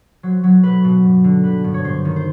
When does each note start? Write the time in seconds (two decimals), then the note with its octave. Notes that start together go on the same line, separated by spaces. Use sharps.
0.23 F#3 C5
0.43 F#3
0.63 B2 B4
0.84 B2
1.03 G2
1.24 D3
1.44 G3 B4
1.64 G2
1.74 C#5
1.84 G2 C5
2.05 D#3
2.16 C5